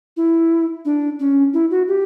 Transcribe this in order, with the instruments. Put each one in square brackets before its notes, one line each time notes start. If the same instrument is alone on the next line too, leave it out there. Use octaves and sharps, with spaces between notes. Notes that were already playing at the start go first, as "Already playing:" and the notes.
[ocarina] E4
D4
C#4
E4
F#4
G4